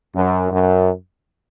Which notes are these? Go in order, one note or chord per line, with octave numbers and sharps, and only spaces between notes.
F#2
F#2